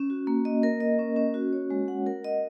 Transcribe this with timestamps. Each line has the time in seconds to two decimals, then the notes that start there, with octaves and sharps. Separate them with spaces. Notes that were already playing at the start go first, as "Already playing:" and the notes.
Already playing: C#4
0.10 F#4
0.27 A#3
0.45 D#5
0.63 A#4
0.80 D#5
0.99 C#4
1.16 C#4
1.34 F#4
1.53 C#5
1.70 G#3
1.88 F#5
2.06 A#4
2.24 D#5